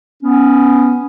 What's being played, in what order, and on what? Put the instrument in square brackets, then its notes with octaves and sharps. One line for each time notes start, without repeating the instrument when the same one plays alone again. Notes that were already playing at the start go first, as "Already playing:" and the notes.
[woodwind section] B3 C#4